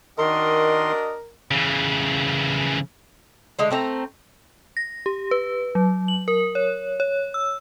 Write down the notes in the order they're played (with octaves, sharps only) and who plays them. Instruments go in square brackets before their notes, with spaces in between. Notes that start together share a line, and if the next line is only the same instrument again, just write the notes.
[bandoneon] D#3 C6 [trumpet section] D4 F#4 D#5 [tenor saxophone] A#4
[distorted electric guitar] C#3 E3
[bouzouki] D3 G#3 A3
A3 C4 D5 A#5
[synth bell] A#6
G4
B4
F#3
F#7
A#4
C#5
C#5
E6